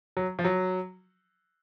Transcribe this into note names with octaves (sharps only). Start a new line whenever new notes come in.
F#3
F3
F#3